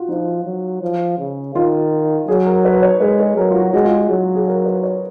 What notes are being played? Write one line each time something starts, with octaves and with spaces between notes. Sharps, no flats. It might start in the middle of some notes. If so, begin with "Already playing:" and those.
Already playing: F4 F#4
F3 D#4
F#3
F3
C#3
D#3 F4
F#3 G#4
A#4
B4
C#5
G#3 B4
B4
F#3 A#4
F4
F#4
G#3 F#4
F4
F#4
F#3
G#4
A#4
B4
C#5